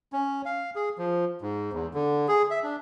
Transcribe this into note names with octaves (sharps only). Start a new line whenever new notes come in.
C#4
F5
G#4
F3
G#2
E2
D3
G#4
E5
D4